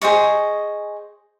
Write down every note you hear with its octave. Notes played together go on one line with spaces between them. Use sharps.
G#4 C5 D#5 C#6